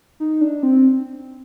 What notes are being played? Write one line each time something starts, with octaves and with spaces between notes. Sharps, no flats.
D#4
D4
C4